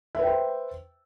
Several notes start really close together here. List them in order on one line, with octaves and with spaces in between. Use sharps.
E5 B4 G5 C5